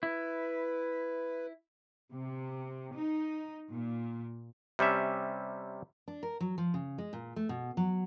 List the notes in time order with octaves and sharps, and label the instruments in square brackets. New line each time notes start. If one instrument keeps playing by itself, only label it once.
[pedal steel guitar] E4 [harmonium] B4
[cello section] C3
D#4
A#2
[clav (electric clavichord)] C3 G3 C#4 E5
[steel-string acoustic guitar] D4
A#4
F#3
F3
C#3
G#3
A#2
A3
B2
F#3